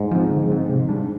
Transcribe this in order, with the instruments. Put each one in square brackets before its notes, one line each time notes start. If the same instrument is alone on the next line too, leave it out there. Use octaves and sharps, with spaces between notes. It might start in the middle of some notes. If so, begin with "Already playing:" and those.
Already playing: [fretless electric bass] G#2
[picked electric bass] F3 C4
D3
F3 C4
C3
G3 D4